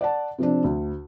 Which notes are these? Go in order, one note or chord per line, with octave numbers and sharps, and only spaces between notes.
D5 F#5 A5
C3 F3 C4 D4
D2